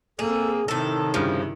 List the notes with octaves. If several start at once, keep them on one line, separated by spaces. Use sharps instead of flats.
A#3 C4 G#4 A4
A2 C3 D#3 E4 A4
G2 C#3 F3 E4